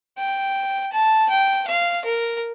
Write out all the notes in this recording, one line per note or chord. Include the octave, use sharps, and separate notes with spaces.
G5
A5
G5
F5
A#4